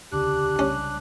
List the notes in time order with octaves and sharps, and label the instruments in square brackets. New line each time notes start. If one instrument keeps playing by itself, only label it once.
[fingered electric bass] E1 D2 C#3 [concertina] D4 F#6 [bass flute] G4
[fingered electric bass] C2 C#3 G3 [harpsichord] C#4